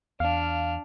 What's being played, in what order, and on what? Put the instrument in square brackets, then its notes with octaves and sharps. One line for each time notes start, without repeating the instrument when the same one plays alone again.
[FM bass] E2 [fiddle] D4 F6 [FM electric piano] F5